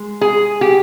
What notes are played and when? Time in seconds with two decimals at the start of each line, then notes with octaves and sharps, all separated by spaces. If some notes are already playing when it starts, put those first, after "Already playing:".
Already playing: G#3
0.21 G#4
0.61 G4